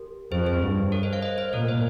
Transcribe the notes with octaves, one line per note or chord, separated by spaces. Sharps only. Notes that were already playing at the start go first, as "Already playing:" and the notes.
Already playing: G4 A#4
F2 G#4 C5
G#4 C5
G2
A#4 C#5
C5 D#5
C#5 F5
C5 D#5
C5 D#5
A#2 A#4 C#5
C5 D#5